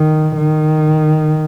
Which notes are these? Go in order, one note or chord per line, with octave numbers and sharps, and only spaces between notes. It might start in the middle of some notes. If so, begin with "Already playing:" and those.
Already playing: D#3
D#3